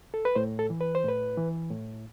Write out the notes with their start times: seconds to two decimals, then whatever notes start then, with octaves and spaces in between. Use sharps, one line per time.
0.14 A4
0.25 B4
0.36 A2 C5
0.59 A4
0.70 E3
0.81 B4
0.95 C5
1.04 A2 B4
1.37 E3
1.71 A2